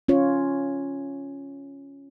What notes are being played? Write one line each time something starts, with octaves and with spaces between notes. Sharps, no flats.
C#4 F4 C#5